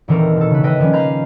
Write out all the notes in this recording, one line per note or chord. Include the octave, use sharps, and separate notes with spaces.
D#1 D#3 E3 C4 A4 A#4
B2 A4
C#3 B4
B4 D#5 E5 G5
D#3 F3 G3 G#3 C#4
D#5 F5 A#5 B5 G6 G#6